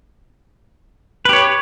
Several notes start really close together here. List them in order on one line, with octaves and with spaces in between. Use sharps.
B4 G4 C#5